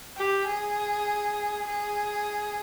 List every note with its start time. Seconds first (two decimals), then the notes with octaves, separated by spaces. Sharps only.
0.17 G4
0.47 G#4
1.67 G#4